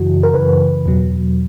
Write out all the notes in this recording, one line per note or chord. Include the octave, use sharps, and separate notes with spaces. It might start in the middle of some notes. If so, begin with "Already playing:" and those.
Already playing: F#2 C#3 E3 F#4
A#4
F#2 C#3 E3 B4
E2 B2 F#3